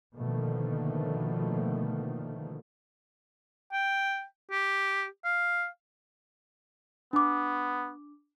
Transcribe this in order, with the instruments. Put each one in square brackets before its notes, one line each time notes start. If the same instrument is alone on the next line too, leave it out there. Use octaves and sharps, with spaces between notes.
[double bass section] B2 D3 D#3 F3 A3 A#3
[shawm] G5
G4
F5
[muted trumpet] B3 [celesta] D4 D6